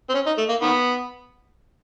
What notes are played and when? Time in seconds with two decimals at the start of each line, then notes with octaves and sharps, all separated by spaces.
0.09 C4
0.14 C#4
0.26 D#4
0.38 A3
0.49 A#3
0.62 D#3 B3